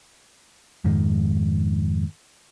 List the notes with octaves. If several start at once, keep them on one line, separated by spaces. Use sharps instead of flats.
F2 G#2 D#3 G#3